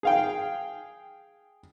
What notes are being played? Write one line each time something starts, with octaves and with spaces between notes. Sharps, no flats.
G#4 F5 G5